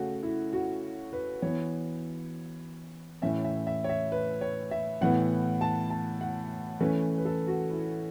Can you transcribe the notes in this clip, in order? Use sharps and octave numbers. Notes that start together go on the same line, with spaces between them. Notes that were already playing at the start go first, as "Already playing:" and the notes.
Already playing: C#3 A3 C#4 F#4
E4
F#4
B4
E3 B3 C#5
A2 E3 C#4 E5
E5
E5
C#5
E5
B4
C#5
E5
A2 E3 B3 F#5
A5
A5
F#5
E3 A3 C#4 B4
B4
A4
F#4
E4